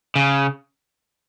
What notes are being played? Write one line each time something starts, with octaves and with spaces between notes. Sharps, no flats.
C#3